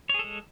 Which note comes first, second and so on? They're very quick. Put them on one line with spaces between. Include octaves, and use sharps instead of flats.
C#5 G#4 A4 G#3